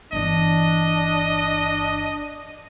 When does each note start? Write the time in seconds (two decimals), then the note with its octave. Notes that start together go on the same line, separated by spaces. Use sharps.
0.12 G1 E3 D4 D#5